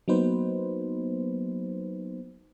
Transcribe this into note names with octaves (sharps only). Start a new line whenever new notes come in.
F#3 A#3 B3 D#4 B4 C5